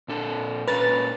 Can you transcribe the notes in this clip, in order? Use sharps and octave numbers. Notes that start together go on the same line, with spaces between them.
A#2 D4 A4
A#2 C#4 A#4 B4 A6